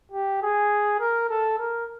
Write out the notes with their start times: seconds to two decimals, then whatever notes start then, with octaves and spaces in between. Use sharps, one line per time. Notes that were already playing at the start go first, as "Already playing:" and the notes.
0.12 G4
0.42 G#4
1.00 A#4
1.30 A4
1.59 A#4